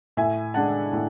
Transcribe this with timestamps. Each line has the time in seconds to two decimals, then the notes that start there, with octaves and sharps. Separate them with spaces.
0.17 A2 E5 G#5
0.54 G#3 D4 F#5 A5
0.93 A2